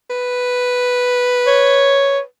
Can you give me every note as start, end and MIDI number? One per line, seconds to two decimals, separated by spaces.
0.10 2.24 71
1.47 2.19 73